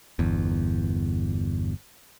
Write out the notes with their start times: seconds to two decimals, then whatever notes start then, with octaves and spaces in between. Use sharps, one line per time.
0.19 G1 E2